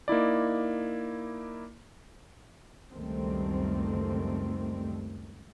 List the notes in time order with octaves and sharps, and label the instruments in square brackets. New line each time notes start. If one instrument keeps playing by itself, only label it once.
[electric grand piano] A#3 D#4 E4 D5
[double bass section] C#2 F#2 D#3 G3 A3 C4